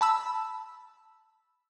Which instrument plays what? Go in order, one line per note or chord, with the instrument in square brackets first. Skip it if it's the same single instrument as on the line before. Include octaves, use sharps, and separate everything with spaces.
[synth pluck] A5 B5 E6